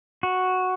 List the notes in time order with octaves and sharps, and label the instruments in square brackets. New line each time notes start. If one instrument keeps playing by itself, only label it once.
[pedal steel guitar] F#4